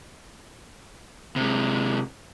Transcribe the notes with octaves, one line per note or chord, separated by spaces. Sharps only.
C3 G#3